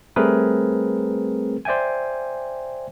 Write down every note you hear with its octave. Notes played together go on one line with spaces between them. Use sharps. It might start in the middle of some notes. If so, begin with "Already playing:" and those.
G3 A3 C4 G#4 A#4 B4
C5 D5 E5 G5 G#5